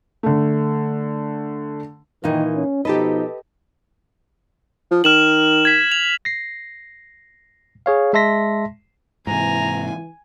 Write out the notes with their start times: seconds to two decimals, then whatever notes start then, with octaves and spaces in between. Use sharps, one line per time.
0.23 D3 A3
2.24 A#2 D#3 E3 D#4
2.56 C#4
2.85 B2 F3 D#4 G4 A4 B4 D#5
4.91 F3
5.04 D#3 F6 E7 F#7
5.65 G#6 B6
5.92 F7
6.25 A#6 C7
7.86 G#4 C#5 F5
8.13 G#3 E5 A5 C6 A#6 B6
9.27 G#2 C3 E3 G#5 A#5